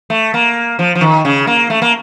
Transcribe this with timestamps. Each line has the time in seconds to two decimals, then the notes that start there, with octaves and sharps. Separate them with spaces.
0.10 A3
0.34 A#3
0.79 F3
0.95 F3
1.01 D#3
1.25 C#3
1.47 A#3
1.70 A3
1.82 A#3